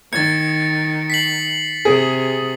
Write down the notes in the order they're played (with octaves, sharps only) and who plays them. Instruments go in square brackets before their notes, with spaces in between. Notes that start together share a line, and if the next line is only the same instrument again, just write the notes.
[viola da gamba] D#3 [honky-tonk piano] G#6 [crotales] A6 C#7
[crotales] B6 C7 F#7
[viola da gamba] C3 [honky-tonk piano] G#4